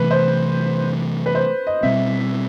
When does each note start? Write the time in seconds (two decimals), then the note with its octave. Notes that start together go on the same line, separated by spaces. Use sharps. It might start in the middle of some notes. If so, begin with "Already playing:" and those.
Already playing: C3 E3 A3 B4
0.11 C5
1.26 B4
1.35 C5
1.67 D#5
1.83 B2 G3 C4 E5